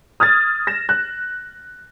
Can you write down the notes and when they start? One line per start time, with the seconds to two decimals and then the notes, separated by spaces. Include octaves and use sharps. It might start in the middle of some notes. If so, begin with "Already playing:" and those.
0.20 D#6 F6 G#6 A6
0.67 A#6 E7
0.89 F#6